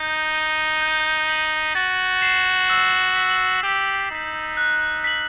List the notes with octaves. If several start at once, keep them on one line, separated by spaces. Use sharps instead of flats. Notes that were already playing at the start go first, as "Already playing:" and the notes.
Already playing: D#4 G6
D#7 G7
G6
B6 D#7 F#7
F#4 A6
C7 E7
E6
B6 F#7
G4 E6
D#4 G6 B6
F#6
B6 F#7